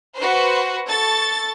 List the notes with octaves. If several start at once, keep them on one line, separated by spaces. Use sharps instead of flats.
F#4 B4 C5
A4 C#6 A6